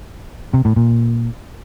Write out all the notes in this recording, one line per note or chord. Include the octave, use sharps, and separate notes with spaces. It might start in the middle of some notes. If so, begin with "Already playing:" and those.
C3
A2
A#2